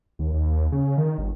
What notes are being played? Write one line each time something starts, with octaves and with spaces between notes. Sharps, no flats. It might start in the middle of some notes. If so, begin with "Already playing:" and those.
D#2
D#2
C#3
D#3
G1